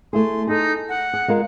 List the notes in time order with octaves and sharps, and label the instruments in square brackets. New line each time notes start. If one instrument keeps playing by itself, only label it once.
[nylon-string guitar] A3 E4 G#4 [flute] C6
[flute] D#4 [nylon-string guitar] G#4 A4
[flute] F#5
[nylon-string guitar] G#4
G#3 F4 A#4